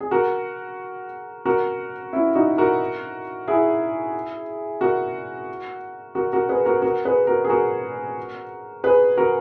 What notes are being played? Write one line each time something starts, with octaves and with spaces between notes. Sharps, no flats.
G#4
F#4 A#4
F#4 A#4
C#4 E4
D#4 F#4
F#4 A#4
E4 G#4
F#4 A#4
F#4 A#4
F#4 A#4
G#4 B4
F#4 A#4
F#4 A#4
G#4 B4
F#4 A#4
G#4
F#4 A#4
G#4 B4
F#4 A#4